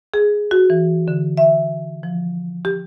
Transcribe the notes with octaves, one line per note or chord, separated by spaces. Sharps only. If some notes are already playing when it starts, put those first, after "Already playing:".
G#4
F#4
E3
D3
E5
F3
G4